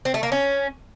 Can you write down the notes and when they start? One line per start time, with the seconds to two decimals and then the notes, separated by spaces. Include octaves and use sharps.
0.05 C4
0.14 A3
0.23 A#3
0.32 C#4